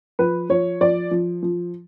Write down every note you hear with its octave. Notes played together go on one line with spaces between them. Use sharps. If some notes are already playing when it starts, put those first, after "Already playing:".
F3 B4
F3 C#5
F3 D5
F3
F3